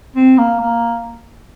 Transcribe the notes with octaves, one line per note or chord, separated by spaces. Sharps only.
C4
A#3
A#3